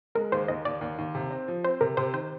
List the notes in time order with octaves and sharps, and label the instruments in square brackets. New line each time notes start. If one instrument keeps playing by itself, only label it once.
[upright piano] G#3 [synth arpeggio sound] A#4
[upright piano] D#2 [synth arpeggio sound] C5
[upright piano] D#2 [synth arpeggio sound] D#5
[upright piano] D#2 [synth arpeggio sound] D5
[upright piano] D#2
D#2
C3
C4
F3
[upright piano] C4 [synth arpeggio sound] C5
[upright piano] C3 [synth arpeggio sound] A#4
[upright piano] C3 [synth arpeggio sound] C5
[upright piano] D#3 [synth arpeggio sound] C5